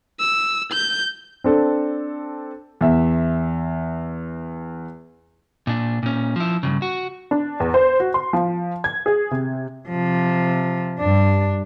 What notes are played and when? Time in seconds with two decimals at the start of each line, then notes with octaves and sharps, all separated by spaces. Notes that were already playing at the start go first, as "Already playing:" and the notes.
0.20 E6
0.72 G6
1.44 C4 D4 A4
2.81 E2 E5
5.67 A#2 D4
6.03 A#2 C#4
6.36 F3 E4
6.63 G2 C#3
6.82 F#4
7.31 D4
7.60 E2
7.74 C5
8.00 F#4
8.14 C6
8.33 F3
8.84 G#6
9.06 G#4
9.31 C3
9.89 C3 F3
11.00 G2 D4